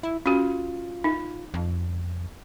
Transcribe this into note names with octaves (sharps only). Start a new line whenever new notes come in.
E4
C#4 F4 F#4
D#4
F2